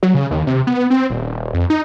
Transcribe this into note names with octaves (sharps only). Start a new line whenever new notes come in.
F#3
C#3
D#2
C3
B3
C4
D#1
F2
D#4